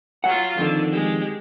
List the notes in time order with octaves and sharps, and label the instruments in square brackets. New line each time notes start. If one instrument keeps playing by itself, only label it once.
[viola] F#3 F4 [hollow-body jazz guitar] F#5
[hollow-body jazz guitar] F2 D#3 [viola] D3
[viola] G#3 G4